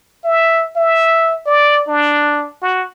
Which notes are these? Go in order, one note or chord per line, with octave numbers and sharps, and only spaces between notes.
E5
E5
D5
D4
F#4